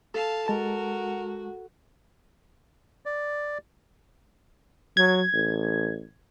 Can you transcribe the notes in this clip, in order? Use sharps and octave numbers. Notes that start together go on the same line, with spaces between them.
A4 F5 A5
G#3 F#4 A#4 A5
D5
F#3 G#6
A1